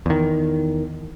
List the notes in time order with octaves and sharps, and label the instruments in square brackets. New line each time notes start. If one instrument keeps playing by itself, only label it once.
[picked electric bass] E2 D#3